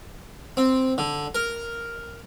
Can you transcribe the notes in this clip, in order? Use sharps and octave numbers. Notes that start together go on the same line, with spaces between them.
C4
D3
A#4